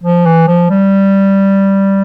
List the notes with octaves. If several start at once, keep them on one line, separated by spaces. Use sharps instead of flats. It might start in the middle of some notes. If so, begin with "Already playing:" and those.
F3
E3
F3
G3